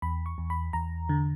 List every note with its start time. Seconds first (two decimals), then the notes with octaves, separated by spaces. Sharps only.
0.02 E2 B5
0.26 C#6
0.38 E2
0.50 B5
0.73 E2 A#5
1.09 D3